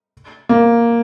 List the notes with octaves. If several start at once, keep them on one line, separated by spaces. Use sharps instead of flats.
A#3